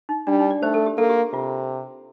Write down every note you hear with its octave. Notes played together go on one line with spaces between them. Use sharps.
D#4
G3 D4
D#4
D5
A3 C5
A4
G4
A#3 A4
G4
C3 F4